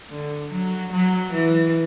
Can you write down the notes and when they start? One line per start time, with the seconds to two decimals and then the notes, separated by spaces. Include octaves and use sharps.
0.10 D3
0.51 F#3
0.92 F#3
1.33 E3